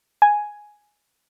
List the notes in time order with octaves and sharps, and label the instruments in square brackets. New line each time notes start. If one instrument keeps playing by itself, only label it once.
[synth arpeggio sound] G#5